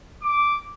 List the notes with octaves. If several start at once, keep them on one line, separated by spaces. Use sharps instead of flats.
D6